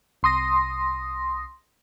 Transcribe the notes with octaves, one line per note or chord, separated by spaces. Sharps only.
C2 C6 D#6 A#6